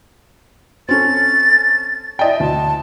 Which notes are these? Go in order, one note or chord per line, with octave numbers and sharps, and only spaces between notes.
C4 C#4 A4 A6
E4 D5 D#5 G5
D2 A5